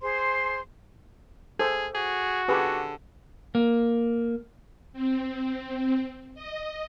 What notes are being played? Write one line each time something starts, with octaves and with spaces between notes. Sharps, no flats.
G#4 C5 C6
G#4 A4 C5
F#4 G#4
D3 G4 G#4 B4
A#3
C4
D#5